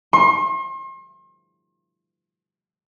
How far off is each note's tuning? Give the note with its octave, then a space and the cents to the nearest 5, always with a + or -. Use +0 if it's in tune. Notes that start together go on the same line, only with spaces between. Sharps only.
C6 +40